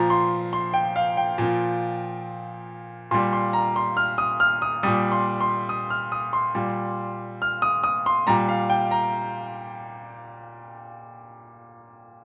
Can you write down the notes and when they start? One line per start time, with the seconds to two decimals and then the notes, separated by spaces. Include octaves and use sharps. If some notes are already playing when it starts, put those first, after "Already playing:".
Already playing: A#2 F3 A#5
0.10 C6
0.53 C6
0.74 G5
0.96 F5
1.17 G5
1.38 A#2 F3
3.11 A#2 G3 C6
3.33 C6
3.53 A#5
3.76 C6
3.97 F6
4.18 D#6
4.40 F6
4.62 D#6
4.83 G3 D#6
4.87 A#2
5.12 C6
5.41 C6
5.69 D#6
5.90 F6
6.12 D#6
6.33 C6
6.55 A#2 G3
7.42 F6
7.62 D#6
7.84 D#6
8.06 C6
8.27 A#2 G3 A#5
8.49 F5
8.70 G5
8.91 A#5